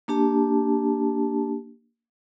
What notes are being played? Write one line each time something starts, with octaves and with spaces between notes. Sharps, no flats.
A#3 D4 G4 A5